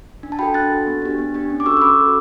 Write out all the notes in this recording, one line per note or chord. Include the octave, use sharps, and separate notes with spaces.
D4
A5
F#4 A4 G5 B5
D4 F#6 A6
F#4 A4
B3
D4 G4
B3
D4 G4
C#4
D6
F#4 A4 C#6 E6
E6
C#4 B5 D6
F#4 A4